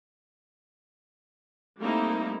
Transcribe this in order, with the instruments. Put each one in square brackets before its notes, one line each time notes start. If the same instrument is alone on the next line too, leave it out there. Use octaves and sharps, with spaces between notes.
[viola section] G3 A3 A#3 C4 D#4 E4